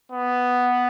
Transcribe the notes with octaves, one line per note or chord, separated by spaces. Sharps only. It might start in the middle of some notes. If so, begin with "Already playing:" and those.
B3